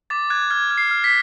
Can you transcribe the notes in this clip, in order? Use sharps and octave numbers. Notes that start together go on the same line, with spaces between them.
D6 A6
F#6 G#6
F6 G#6
F6
C7
F6
B6